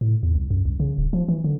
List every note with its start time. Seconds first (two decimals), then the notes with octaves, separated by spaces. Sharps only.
0.01 A2
0.23 E2
0.35 C2
0.50 F#2
0.65 C2
0.80 C#3
0.98 D#1
1.13 F3
1.28 E3
1.44 D3